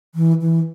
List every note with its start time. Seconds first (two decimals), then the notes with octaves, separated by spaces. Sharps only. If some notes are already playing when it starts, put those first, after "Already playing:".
0.15 E3
0.41 E3